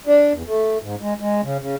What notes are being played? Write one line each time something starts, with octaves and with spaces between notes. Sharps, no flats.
D4
E2
A3
G#2
G#3
G#3
C#3
C#3